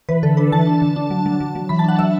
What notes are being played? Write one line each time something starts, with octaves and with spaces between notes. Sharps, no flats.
E3 B4
D3 A4
D4 B4
E3 A5
D4
D3
D4
F#3
F#3
F#3
F#3
E3 B5
A5
D4 F#5
F#3 E5